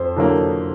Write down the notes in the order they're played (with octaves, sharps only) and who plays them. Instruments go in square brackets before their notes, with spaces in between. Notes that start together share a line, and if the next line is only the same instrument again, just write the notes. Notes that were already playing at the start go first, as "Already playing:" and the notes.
Already playing: [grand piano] F2 [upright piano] C5
[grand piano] D3 F#3 A#3